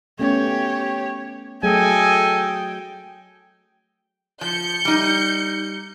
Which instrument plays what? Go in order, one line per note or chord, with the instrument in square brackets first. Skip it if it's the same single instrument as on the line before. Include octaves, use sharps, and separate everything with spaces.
[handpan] A3 B3 C#4 [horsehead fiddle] G4 C#5
[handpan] F#3 A3 G#4 [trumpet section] A4 D#5 G#5 [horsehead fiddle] G5
[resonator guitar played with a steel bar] F3 [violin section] G6 C#7
[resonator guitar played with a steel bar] G3 D#4